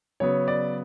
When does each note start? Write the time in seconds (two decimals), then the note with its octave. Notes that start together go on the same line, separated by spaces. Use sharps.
0.20 C#3 F#3 B3 C#5
0.48 D5